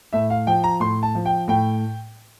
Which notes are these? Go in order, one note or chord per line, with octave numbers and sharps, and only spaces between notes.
A2 E5
F5
F3 G5
A#5
A2 C6
A5
F3
G5
A2 G5